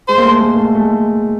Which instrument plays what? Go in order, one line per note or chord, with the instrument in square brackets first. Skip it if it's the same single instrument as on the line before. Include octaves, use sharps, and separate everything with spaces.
[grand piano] G#3 [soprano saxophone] C5
[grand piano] A#3
A3
G#3 A#3
A3
A3
G#3